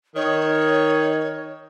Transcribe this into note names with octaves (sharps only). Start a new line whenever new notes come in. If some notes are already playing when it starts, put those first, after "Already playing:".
D#3 C#5